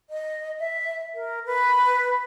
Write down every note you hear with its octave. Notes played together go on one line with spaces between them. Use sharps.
D#5
E5
A#4
B4